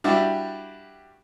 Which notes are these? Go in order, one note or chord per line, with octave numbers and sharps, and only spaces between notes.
G3 D4 E4 F#4 G4